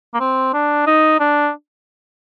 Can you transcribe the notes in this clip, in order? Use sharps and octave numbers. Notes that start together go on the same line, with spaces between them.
A#3
C4
D4
D#4
D4